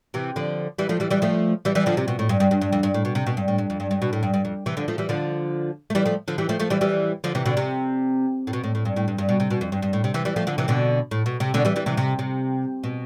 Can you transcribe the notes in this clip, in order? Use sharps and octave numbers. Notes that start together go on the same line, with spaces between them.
C3 E3
D3 F3
E3 G3
F3 A3
E3 G3
E3 G3
F3 A3
E3 G3
E3 G3
D3 F3
C3
B2
A2
G2
G2
G2
G2
F2
G2
A2
B2
C3
B2
G2
A2
G2
F2
G2
G2
B2
A2
G2
G2
F2
C3 E3
D3 F3
F3 A3
E3 G3
D3 F3
A3
E3 G3
F3 A3
D3 F3
E3 G3
F3 A3
F3 A3
E3 G3
E3 G3
D3 F3
C3 E3
B2 D3
C3
A2
B2
A2
A2
G2
A2
G2
G2
B2
C3
B2
F2
G2
G2
A2
C3
C3 E3
E3 G3
F3 A3
D3 F3
C3 E3
B2 D3
A2
B2
C3
B2 D3
E3 G3
E3 G3
C3 E3
C3
C3
B2